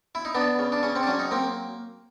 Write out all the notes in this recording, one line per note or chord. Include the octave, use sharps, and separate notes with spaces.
E4
D#4
B3 D4
C#3
D4
C#3 C#4
C4
D4
F#3 C#4
D#4
A#3 C4